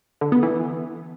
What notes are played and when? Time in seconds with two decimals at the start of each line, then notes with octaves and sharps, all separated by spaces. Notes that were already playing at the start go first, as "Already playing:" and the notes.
0.21 D3
0.32 B3
0.43 E3